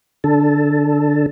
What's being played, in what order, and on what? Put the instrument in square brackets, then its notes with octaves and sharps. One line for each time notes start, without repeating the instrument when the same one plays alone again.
[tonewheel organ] D3 A4